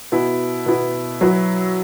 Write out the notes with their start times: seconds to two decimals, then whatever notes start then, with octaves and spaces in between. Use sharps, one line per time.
0.12 B2 B3 E4
0.66 B2 B3 E4
1.21 F#3 E4 B4